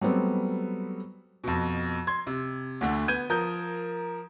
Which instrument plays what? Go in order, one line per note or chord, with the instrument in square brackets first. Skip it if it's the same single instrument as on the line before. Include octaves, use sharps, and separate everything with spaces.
[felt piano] F#3 G3 A3 B3 C4
[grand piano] F2 B2
C6 G#6
C3
D2 D3 A3
B3 G6 G#6 D#7
F3 A#4 D#6 G6